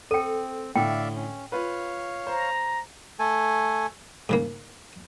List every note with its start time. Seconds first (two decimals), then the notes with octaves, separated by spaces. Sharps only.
0.11 C4 A4 G5 C#7 D#7
0.76 A2 D3 D5 E5 F5 G5
1.16 C#4
1.52 F4 B4 C#5 F5
2.27 C5 A#5
3.19 A3 A4 G#5
4.29 G#2 C#3 A#3